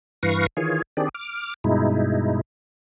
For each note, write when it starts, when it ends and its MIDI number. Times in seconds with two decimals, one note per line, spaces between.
0.23 0.47 43
0.23 0.47 52
0.23 0.47 71
0.23 0.47 77
0.23 0.47 85
0.23 0.47 94
0.57 0.82 51
0.57 0.82 52
0.57 0.82 65
0.57 0.82 68
0.57 0.82 73
0.97 1.09 51
0.97 1.09 60
0.97 1.09 62
0.97 1.09 67
0.97 1.09 68
0.97 1.09 74
1.14 1.54 86
1.14 1.54 89
1.64 2.41 43
1.64 2.41 47
1.64 2.41 56
1.64 2.41 63
1.64 2.41 64